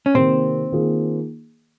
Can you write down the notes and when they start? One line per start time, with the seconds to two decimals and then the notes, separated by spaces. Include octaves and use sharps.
0.06 C#4
0.14 C3 D#3 A#3 C4
0.72 D#3 A#3 F4 G#4